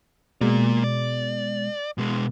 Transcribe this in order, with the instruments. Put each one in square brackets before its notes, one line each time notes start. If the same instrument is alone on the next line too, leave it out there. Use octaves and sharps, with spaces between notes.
[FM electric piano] B2 G#3 [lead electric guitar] A#3 D5
[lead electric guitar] D5
B2 G#3